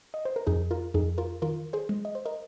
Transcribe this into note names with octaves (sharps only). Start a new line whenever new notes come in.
D#5
C5
A#4
F2 D#4 G#4
F4 A#4
F2 D#4 G#4
F4 A#4
D#3 F4 A#4
G#4 C5
G#3
D#5
C5
A#4 D#5